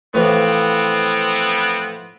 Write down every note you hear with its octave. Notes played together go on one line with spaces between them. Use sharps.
A2 E3 F3 B3 C4